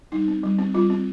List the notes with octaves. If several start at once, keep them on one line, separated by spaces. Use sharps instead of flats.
G3 D#4
C4
G3
C4
G3 F4
C4